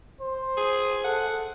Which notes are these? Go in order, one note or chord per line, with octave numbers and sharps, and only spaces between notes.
C5
G#4
A4 F#5